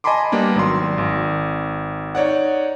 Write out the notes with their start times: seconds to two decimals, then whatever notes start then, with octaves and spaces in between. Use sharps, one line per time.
0.04 D#5 G#5 A5 B5 C6 D6
0.32 G3 A#3 B3 D4
0.56 G#1 F#3 C6
0.98 G#1
2.15 D#4 C#5 D5 F#5